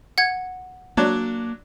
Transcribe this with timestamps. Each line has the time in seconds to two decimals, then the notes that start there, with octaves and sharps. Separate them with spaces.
0.18 F#5 G#6
0.97 F#3 A#3 D4